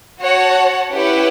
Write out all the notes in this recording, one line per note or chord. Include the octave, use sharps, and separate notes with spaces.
F#4 C#5 F#5 A5
C#4 E4 G4 B4 F#5